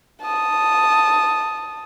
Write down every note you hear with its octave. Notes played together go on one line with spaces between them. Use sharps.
A5 D#6